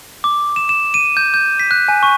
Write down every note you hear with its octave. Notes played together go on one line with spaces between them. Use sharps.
D6
E7
E7
D#7
G6
G6
B6
F#6
G#5
C#6